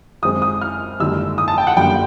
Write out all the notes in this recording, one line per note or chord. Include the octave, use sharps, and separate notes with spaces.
F#2 D#3 G#3 C4 D#6
D#6
F6
G#1 F#2 D3 G3 A#3 E6
D#6
A5
G5
F#5
G1 F#2 D3 G3 A#3 G5